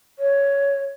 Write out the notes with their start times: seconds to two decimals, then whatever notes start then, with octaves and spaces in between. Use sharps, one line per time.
0.19 C#5